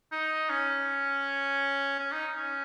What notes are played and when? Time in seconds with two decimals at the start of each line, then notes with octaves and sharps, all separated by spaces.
0.12 D#4
0.50 C#4
1.99 C#4
2.12 D#4
2.37 C#4